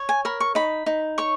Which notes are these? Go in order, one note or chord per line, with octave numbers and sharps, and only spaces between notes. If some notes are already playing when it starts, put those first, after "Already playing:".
Already playing: C#5
G#5
A#4 B5
C#6
D#4 B5
D#4
C#5 C#6